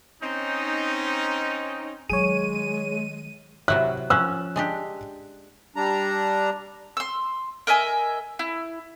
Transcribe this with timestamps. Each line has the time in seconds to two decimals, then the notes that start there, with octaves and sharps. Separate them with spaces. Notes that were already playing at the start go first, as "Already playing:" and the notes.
0.21 C4 C#4 D#4
2.10 D#3 F#3 G#3 G#4 C#5 D#7
3.68 C3 F#3 E4 F#6
4.10 F3 C#4 E6 F#6
4.56 G#3 D4 G4
5.76 G3 D4 A#5
6.97 C6 E6
7.67 A#4 D#5 E5 G#5
8.39 E4